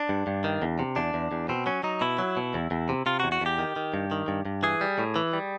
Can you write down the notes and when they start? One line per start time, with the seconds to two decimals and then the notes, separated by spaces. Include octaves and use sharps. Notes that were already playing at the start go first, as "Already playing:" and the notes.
Already playing: D4
0.09 G2
0.27 G2
0.44 D#3
0.62 E2
0.79 C3
0.96 E2 D4
1.14 E2
1.32 E2
1.49 B2 C4
1.66 F#3 C#4
1.83 F#3 D#4
2.01 B2 E4
2.19 F#3
2.37 B2
2.54 E2
2.71 E2
2.89 C3
3.06 C3 F4
3.20 F#4
3.24 E2
3.32 F#4
3.41 E2 G4
3.59 D#3
3.76 D#3
3.94 G2
4.11 D#3
4.28 G2
4.45 G2
4.63 E3 G#4
4.81 G3
4.99 A2
5.16 E3
5.33 G3